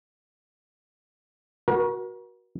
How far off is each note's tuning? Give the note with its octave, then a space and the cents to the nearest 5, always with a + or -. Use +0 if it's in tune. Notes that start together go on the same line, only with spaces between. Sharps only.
F#4 +0 A#4 +40